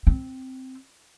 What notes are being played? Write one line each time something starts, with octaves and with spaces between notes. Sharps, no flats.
C4